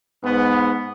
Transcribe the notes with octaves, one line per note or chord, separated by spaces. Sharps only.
G#2 B3